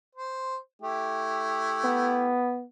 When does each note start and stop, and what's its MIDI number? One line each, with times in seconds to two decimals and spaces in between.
0.15 0.56 72
0.82 2.36 57
0.82 2.36 64
0.82 2.36 67
1.84 2.65 59